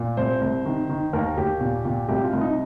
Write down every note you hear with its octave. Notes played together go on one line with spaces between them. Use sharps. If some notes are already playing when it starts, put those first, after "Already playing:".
Already playing: A#2
C2 C5
C2
D#3
D#3
D#2 A#4
D#2 G4
A#2
A#2
C2 G4
F4
C2
D#4